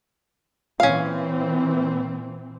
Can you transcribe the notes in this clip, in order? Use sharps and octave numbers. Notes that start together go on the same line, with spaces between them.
A#2 E3 C4 C#4 F5